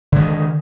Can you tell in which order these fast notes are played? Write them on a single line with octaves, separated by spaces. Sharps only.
D3 G#3 D#3